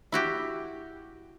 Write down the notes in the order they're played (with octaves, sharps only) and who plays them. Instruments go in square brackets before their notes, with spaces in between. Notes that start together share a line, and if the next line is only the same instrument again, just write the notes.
[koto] E4 F#4 G4